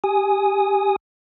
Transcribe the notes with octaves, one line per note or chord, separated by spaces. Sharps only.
G4 G#5 D#6